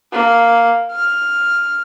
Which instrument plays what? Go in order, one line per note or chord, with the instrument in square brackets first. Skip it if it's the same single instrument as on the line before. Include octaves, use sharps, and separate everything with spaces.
[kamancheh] A#3
F6